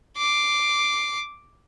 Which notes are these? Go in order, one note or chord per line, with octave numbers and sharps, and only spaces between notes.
D6 C7